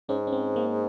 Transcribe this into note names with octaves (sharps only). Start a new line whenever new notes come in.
G#2 C#4
C#4
C4
A#3